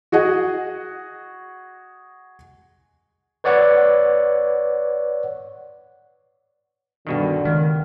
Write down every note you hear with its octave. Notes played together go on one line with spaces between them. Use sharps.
F#4 G#4 D#5 F#5
B4 C#5 D5 F#5
G2 B2 D3 D#3
C#2 D#3